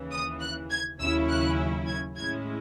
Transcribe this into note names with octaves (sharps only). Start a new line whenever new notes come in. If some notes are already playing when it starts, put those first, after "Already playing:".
Already playing: D#2 C#3 E3
D#6
F#6
G#6
D#2 C#3 F#3 C#4 E4 E6
F#6
G#6
A2 G#3 C#4 E4 G#6